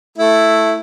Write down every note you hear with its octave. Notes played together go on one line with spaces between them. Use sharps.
A3 E4